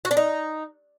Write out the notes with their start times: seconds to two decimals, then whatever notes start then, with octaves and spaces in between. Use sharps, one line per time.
0.05 F#4
0.11 D4
0.17 D#4